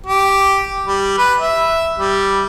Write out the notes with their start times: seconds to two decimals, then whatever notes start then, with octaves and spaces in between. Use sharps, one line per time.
0.06 G4
0.86 G3
1.18 B4
1.40 E5
1.98 G3